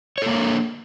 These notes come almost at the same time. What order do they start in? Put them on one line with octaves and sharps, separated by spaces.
C#5 A4 A#3 A#4 D4